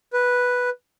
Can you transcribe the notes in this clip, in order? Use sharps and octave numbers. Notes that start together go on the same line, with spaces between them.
B4